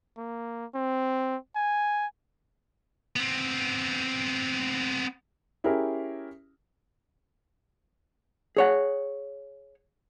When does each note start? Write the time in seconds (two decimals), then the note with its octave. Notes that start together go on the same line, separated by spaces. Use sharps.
0.17 A#3
0.75 C4
1.56 G#5
3.16 B3 C4
5.64 C#4 E4 G4 G#4 A#4
8.57 G#4 C#5 F#5